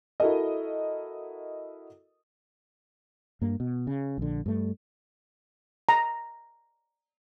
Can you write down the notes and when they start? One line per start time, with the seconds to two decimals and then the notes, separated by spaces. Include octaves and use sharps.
0.20 E4 F#4 A4 A#4 D#5
3.41 G2 A#3
3.60 B2
3.87 C#3
4.18 A#1 D3
4.46 G2 A3
5.89 A#5